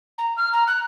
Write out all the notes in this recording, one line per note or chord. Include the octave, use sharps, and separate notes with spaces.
A#5
F6
A#5
F#6